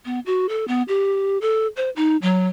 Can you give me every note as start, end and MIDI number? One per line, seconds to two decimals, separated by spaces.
0.05 0.20 59
0.26 0.46 66
0.49 0.67 69
0.68 0.82 59
0.88 1.38 67
1.41 1.67 69
1.77 1.90 72
1.96 2.17 63
2.22 2.48 54